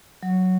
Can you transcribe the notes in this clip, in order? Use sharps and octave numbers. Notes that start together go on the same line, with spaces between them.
F#3